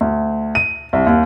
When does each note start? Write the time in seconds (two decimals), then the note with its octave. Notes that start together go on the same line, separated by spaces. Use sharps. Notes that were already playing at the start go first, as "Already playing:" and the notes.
0.01 D2
0.55 D#7
0.93 C2
1.07 D#2